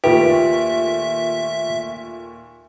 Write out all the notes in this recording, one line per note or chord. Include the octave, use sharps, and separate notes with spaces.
D#2 A#2 A3 F4 G4 A4 B4 E5